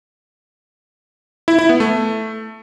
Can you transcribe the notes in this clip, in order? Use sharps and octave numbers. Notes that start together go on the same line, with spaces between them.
E4
E4
B3
A3